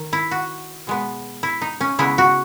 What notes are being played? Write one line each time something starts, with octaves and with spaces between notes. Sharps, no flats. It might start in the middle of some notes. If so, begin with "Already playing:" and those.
Already playing: D#3
E4
F#4
B2 G#3 B3
E4
D#4
C#4
C#3 G#3 B3 E4
F#4